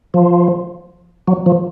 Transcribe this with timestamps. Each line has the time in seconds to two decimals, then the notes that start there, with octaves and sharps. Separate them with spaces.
0.14 F3
1.28 F#3
1.46 F3